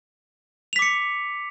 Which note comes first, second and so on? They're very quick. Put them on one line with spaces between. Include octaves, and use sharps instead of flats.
F7 B6 D6 C#7